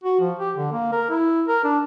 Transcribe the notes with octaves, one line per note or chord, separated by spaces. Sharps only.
F#4
F3
G4
D3
A#3
A#4
E4
A#4
D4